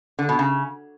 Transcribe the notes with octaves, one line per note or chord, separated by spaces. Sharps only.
D3
B2
C#3